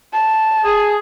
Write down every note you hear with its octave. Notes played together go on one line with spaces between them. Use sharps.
A5
G#4